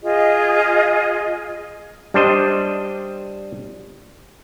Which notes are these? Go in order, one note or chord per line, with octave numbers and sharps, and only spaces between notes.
F4 G#4 D#5
G3 D4 C5 D#5